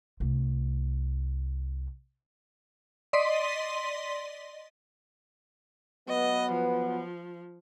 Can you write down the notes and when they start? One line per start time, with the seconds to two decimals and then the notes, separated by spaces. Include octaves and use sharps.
0.20 C2 A3
3.13 D5 D#5 C6 B6 D#7
6.09 F#3 B3 B4 D#5
6.52 F3